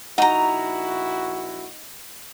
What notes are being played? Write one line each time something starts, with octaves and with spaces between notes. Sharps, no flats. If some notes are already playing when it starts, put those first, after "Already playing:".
A#1 D#4 E4 F#4 F#5 A#5